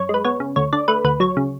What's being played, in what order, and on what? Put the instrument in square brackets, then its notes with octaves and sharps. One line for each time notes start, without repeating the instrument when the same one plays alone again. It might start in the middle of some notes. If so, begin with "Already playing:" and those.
Already playing: [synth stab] F#2 C#5
G#3 B4
B3 C#5
C#3
D2 C#5
D3 D5
A3 B4
D2 B4
F#3 C#5
C#3